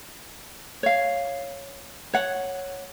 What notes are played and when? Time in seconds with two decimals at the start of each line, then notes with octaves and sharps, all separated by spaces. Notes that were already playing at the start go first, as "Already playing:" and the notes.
0.83 C#5 F5
2.14 C#5 F#5